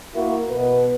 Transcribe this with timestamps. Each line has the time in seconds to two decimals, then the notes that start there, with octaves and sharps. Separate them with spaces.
0.15 A#3 E4 F#4 A#4
0.50 B2 B3 B4